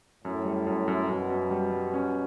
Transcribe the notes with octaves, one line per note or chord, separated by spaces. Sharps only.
F#2 A2
G3
F#2
F#2
F#2 B2
F#2
G3
G3
C#4